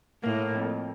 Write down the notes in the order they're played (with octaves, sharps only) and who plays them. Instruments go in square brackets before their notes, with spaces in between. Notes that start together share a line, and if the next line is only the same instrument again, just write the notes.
[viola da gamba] A2 [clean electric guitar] A#3
[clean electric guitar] F2